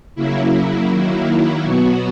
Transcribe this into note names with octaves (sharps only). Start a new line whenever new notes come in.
C#3 F#3 A#3 E4
D#3 F#3 A#3
B2 F#3 B3 F#4